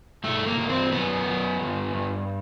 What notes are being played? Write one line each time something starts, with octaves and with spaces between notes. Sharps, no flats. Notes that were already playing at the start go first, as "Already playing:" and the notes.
G2 A3
A#3
G2
C4
F#2 B3
F#2
G2
G2